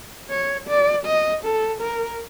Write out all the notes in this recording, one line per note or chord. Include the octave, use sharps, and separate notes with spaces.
C#5
D5
D#5
A4
A#4